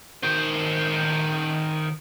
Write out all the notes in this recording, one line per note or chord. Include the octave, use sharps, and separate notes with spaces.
D#3 C5